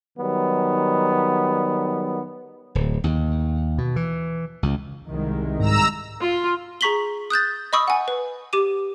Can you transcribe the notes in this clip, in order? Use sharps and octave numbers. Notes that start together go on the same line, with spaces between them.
D#3 F#3 G3 B3
D1
D#2
B2
E3
C#2
C2 D#3 G#3
G#2 A#5 E6
F4
G#4 A#5 C#6 B6 F#7 G7
D#6 F#6 G6 A6
D#5 B5 C#6 D#6 E6
F#5 G#5
B4
G4 D6 D#7